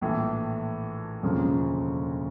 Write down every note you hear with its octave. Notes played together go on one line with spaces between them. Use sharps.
A#1 A2 E3
E1 D2 C#3 F3 A#3